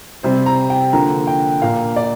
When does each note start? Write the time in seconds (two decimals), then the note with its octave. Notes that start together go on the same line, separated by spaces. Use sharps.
0.23 C3 G3 C4 C5
0.46 A#5
0.70 G5
0.93 D3 F3 A#3 A#5
1.27 G5
1.62 A#2 A#3 F5
1.96 D5